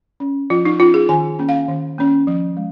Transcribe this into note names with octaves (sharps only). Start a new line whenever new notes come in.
C#4
F3 F4
D#4
C#4 F4
G#4
D#3 G#5
A#3 C#4
F5
D#3
A#3 C#4
F3
G#3